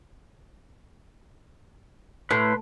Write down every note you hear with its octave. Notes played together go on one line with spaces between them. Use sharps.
A2 B4 C6